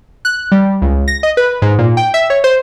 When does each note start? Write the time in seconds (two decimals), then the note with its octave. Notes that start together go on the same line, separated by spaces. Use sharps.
0.25 F#6
0.52 G3
0.82 C#2
1.08 A#6
1.23 D#5
1.37 B4
1.62 G#2
1.79 A#2
1.97 G5
2.14 E5
2.30 C#5
2.44 C5